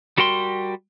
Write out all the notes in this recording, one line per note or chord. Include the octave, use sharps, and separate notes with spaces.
G3 F#4 A#4 G5 C6